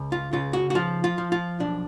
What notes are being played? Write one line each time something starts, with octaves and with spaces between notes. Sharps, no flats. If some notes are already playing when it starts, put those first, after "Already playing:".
Already playing: C#2
F4
C#3 F4
F#4
F#4
F3 F4
F4
F3
F4
B1 D4